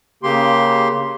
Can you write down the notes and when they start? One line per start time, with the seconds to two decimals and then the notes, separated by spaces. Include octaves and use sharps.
0.23 C#3 A#3 G4 C6